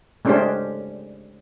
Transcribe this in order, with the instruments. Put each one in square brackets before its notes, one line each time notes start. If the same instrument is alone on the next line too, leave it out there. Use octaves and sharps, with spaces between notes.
[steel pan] G#3 A3 C#4 D4 G4 C5